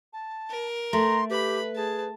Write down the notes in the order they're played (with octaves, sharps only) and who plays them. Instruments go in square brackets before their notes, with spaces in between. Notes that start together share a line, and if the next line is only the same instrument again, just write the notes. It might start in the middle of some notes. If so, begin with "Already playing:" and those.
[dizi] A5
[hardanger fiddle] A#4
[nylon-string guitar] A3 [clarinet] A#5 [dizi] C6
[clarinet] G4 [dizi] B4 [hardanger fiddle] B5
[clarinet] G#4 [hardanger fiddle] A5